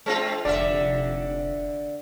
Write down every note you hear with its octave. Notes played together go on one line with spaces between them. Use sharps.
G#3 C4 F4
F1 D3 D5 E5